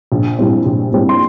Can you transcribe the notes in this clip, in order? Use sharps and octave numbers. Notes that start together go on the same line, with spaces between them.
A#1
A#2 G3 C4 E4
A#1
A#2 G3 C4 E4
C6